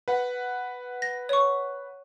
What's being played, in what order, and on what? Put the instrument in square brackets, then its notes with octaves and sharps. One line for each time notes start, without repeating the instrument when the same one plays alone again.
[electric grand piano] B4 F#5
[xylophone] A#6
C#5 C#6